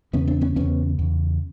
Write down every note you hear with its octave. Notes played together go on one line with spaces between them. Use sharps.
E2 C#3 B3 C#4
C4 D4
B3 C#4
E2 C#3 B3 C#4
E2 C#3